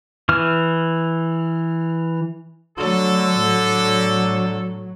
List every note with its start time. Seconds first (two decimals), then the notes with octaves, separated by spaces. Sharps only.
0.29 E3 F6
2.78 D3 F#3 A3 A4
3.38 A2 F#3